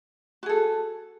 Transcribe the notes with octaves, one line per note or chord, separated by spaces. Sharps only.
F#4 G#4 A4